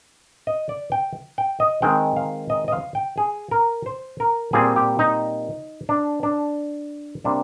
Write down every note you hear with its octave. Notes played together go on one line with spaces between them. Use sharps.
D#5
D5
G5
G5
D#5
D#3 G#3 C4 G5
F5
D#5
D#5
F5
G5
G#4
A#4
C5
A#4
A#2 G3 C4 G#4
G4
D#4
D4
D4
C3 G3 A#3 D4